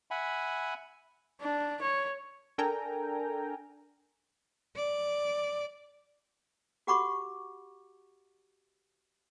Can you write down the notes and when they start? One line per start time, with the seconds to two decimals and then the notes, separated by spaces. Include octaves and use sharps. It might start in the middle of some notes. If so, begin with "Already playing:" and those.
0.11 E5 F#5 G#5 B5
1.41 D4
1.82 C#5
2.58 D4 A4 A#4 G5 G#5 A#5
4.76 D5
6.87 F#4 G4 F#5 B5 C#6 D6